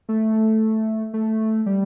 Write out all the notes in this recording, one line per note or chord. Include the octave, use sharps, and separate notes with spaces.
A3
A3
G3